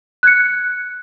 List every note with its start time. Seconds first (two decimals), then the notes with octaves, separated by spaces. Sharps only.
0.23 F#6 G#6 C#7